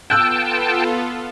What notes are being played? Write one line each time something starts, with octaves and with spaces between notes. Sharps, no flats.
B3 F4 A4 G5 A5 E6 F#6 G6